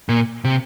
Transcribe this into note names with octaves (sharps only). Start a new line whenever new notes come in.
A#2
C3